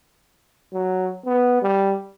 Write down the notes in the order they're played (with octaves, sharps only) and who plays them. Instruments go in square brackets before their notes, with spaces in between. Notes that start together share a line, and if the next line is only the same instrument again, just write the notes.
[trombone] F#3
B3
G3